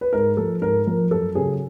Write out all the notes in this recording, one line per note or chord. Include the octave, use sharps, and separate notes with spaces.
B4
G#2 A#4
F3 A4
G#2 A#4
F3 A#4
F#2 A4
C#3 F#3 G#4